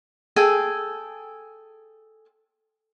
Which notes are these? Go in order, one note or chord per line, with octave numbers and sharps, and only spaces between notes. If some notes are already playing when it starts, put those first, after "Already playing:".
G#4 A4 G5 G#5